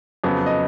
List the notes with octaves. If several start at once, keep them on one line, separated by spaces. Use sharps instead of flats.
F2 C#3 F#3 B3
D#5